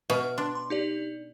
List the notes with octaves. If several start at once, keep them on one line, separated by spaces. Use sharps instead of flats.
B2 E5 F6
D4 C6
C6
D#4 G4 D5